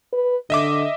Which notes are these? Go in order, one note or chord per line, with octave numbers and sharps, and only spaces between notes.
B4
D3 D#5 E5 D6